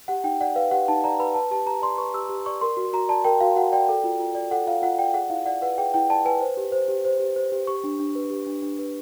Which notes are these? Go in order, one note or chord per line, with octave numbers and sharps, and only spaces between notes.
G4 F#5
D#4 G5
D5 F#5
B4 F5
G4 F#5
D#4 A5
D5 A#5
B4 B5
B4 A5
G4 A5
G4 A#5
D5 C6
B4 C#6
G4 E6
G4
D5 C#6
A#4 C6
F#4
F#4 A#5
D5 A5
A#4 G5
F#4 F5
F#4 F#5
D5 G5
A4
F4
F4
D5
A4 F#5
F4 F5
F4 F#5
D5 G5
G#4 F#5
E4 F5
D5 F#5
B4 F#5
G#4 G5
E4 G5
D5 A5
B4 G#5
C5
G4
C5
G4
C5
G4
C5
G4
G4 C#6
D4
D4
B4
G4
D4
D4
B4